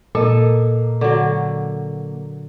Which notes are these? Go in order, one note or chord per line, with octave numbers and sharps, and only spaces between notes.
A#2 A#3 A4 D#5
D3 F#3